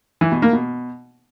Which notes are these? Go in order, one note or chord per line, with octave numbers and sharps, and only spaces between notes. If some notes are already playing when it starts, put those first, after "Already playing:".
E3
B2
A#3
B2